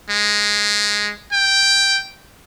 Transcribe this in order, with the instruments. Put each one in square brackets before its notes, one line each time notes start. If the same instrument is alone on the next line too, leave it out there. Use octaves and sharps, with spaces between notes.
[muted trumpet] G#3
G5